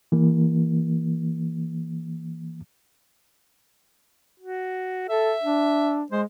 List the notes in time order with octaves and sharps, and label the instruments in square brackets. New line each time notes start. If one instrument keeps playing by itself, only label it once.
[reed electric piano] E3 A#3
[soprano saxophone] F#4
[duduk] A4 [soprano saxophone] E5
[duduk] D4
[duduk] G#3 [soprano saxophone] C5